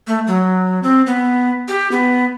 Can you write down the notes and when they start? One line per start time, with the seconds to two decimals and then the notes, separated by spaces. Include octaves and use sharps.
0.07 A3
0.27 F#3
0.83 C4
1.06 B3
1.68 G4
1.92 B3